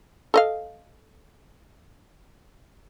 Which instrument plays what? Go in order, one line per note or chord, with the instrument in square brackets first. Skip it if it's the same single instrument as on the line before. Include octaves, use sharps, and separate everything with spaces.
[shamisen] A4 D#5 F5